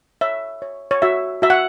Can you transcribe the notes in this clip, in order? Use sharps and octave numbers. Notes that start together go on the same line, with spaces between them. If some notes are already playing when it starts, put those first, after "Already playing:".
C#5 E5
C#5
C#5
F#4 E5
F#4 E5
F#5